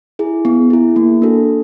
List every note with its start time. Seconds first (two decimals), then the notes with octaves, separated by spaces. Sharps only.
0.19 E4 G#4
0.45 B3
0.70 E4 G#4
0.96 A#3
1.22 D4 F#4 A4